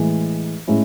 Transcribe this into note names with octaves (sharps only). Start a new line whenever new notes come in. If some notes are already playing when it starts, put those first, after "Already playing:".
Already playing: A2 E3 G#3
A2 G#3 C#4 E4